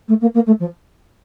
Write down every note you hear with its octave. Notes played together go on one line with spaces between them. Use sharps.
A3
A#3
A#3
A3
F3